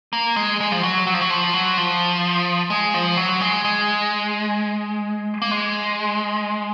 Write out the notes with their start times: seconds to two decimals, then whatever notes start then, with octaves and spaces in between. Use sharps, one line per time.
0.13 A#3
0.36 G#3
0.60 G#3
0.72 F3
0.83 F#3
1.07 F#3
1.14 F3
1.22 F#3
1.30 F3
1.54 F#3
1.77 F3
2.70 G#3
2.94 F3
3.17 F#3
3.41 G#3
3.65 G#3
5.42 A#3
5.51 G#3